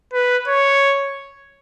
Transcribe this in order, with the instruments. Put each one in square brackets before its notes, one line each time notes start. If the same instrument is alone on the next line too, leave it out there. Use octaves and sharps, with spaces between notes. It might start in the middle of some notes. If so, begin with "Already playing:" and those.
[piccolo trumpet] B4
C#5